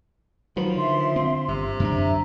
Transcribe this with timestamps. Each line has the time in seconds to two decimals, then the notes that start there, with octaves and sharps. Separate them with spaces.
0.57 D#3 F3 F#3 B4
0.76 D3 E5 C6
1.16 C4
1.48 G1 C3
1.80 F#2 C#4 D4 E5 A#5